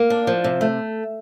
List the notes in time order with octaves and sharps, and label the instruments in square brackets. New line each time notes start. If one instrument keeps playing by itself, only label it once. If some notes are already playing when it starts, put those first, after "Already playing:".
Already playing: [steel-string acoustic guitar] A#3
D4
F3
C3
A3